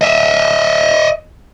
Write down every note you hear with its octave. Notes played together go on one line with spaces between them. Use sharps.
D#5 E5